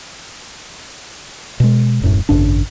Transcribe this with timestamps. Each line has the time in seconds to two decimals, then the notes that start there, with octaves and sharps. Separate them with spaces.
1.60 B2 G#3
2.01 D#1 F#2 A2
2.29 G#1 F#2 C#3 D4